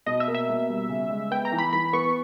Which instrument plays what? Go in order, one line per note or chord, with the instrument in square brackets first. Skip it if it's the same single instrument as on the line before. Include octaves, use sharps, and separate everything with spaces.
[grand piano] B2 [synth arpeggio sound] D#5
[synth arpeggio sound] E5
[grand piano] A#3
[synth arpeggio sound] E5
[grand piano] B2
G3
C#3
G#3
[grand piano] B3 [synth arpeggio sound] G5
[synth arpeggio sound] A#5
[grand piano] E3
[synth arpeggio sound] B5
[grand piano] E3 [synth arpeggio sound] B5
[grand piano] B3 [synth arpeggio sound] C#6